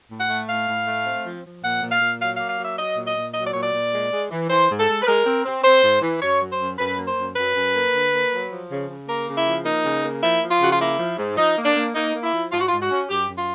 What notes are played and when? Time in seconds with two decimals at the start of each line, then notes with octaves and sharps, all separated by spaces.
0.10 A2
0.19 F#5
0.29 A3
0.48 A2 F5
0.68 A2
0.86 A3
1.05 C4
1.24 F3
1.44 F3
1.62 A#2 F#5
1.82 A#2
1.91 F5
2.00 A#2
2.20 F#3 F5
2.35 A#3 F5
2.49 F5
2.59 F#3 E5
2.77 F#3 D#5
2.96 A#2
3.06 D#5
3.15 A#2
3.34 F#3 D#5
3.44 D5
3.52 A#2 C#5
3.61 D5
3.73 A#2
3.92 G#3
4.12 G#3
4.30 E3
4.49 E3 C5
4.69 G#2
4.78 A4
4.88 G#3
5.02 B4
5.06 G#3 A#4
5.26 C4
5.45 C4
5.63 C4 C5
5.82 G#2
6.01 E3
6.21 F#2 C#5
6.41 F#3
6.50 C5
6.59 F#2
6.78 F#2 B4
6.97 A#3
7.07 C5
7.17 F#2
7.36 F#2 B4
7.54 F#2
7.74 A#3
7.93 D3
8.13 A#3
8.31 F#3
8.51 F3
8.70 C#3
8.88 C#3
9.07 A#3 A#4
9.26 C#3
9.36 E4
9.46 F3
9.65 A#3 D#4
9.84 C#3
10.03 A#3
10.22 F3 E4
10.42 F3
10.51 F4
10.60 C#3 F#4
10.71 F4
10.80 A#3 E4
10.99 F3
11.17 G#2
11.37 F3 D#4
11.56 A#3
11.65 D4
11.76 A#3
11.94 A#3 D#4
12.14 A#3
12.23 E4
12.33 F3
12.51 G#2 F4
12.61 F#4
12.68 G#2 F4
12.80 F#4
12.90 C#4
13.08 F#2 G4
13.27 F#2
13.37 F4